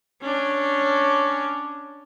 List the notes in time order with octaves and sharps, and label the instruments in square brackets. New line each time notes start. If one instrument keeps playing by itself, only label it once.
[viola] C#4 D4